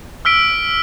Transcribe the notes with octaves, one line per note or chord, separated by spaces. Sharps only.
E6 F6 B6 D7